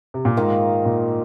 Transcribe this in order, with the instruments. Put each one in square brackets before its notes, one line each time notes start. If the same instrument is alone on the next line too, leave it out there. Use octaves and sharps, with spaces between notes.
[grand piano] C3
A#2
[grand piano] G#2 [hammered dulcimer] D#3 A#3 F4
[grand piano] A#2